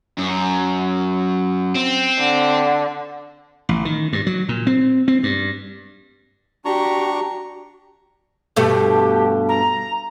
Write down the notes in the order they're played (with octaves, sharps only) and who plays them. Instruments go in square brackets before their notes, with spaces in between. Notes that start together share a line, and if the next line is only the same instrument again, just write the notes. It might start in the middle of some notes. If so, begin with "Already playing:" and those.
[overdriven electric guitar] F#2
C4
[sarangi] D3
[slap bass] A1
D#3
G2
F#3
A#2
C4
C4
G2
[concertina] D4 A#5 C#6 [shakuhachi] F#4 [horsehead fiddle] G4
[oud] G2 B2 A3 [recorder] G4
[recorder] A#5